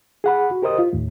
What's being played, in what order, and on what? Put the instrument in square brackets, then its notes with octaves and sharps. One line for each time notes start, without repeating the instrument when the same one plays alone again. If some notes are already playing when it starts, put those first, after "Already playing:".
[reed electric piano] G#4 F#5 B5
F#4
G4 A#4 C5 D#5 D#6
F4
D#2 A2